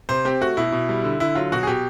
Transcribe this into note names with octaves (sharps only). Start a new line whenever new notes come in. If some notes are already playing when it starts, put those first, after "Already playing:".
C3 C5
C4 G4
A3 F#4
B2 E4
B2
G3
D3
D3 E4
F#3 F4
B2 F#4
G#4
B2 G4